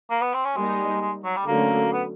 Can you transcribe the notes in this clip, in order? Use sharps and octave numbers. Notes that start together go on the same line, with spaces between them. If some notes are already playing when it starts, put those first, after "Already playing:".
A#3
B3
C4
C#4
G3 G#3 A#3 D#4
G#3
F#3
G3
D3 F#3 A3 A#3 C#4
B3